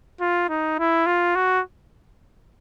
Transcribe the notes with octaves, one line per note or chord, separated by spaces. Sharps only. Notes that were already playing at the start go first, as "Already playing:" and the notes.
F4
D#4
E4
F4
F#4